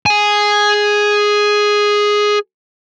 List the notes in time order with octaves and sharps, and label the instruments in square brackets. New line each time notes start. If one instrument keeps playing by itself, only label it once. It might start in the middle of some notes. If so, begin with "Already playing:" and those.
[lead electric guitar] G#4 G#5